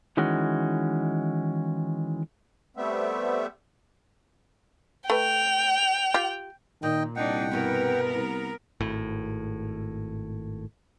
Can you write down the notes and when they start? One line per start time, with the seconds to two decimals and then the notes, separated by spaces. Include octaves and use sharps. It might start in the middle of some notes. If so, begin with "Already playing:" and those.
0.17 D#3 E3 G#3 C#4 F#4
2.77 G3 A3 B3 C4 E5
5.10 A3 B4 G5 F7
6.14 F4 G4
6.83 A#2 D#3 D#5 G5
7.16 C2 D4 D#4 F#5 G5
7.52 G2 B2 E3 B3 A#4
8.11 C2 A#5
8.80 G#1 A2